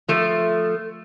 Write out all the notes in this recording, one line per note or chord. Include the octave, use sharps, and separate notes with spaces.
F3 A3